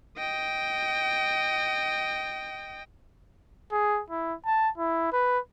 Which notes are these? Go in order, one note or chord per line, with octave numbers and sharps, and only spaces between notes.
D#5 G5
G#4
E4
A5
E4
B4